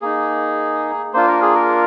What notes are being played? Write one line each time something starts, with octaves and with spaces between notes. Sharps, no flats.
A#3 D#4 G#4
A#3 D4 F4 C5
A#4
G#4
A#4